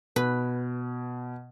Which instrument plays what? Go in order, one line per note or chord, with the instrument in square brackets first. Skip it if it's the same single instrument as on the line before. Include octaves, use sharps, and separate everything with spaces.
[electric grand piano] B2 [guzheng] B4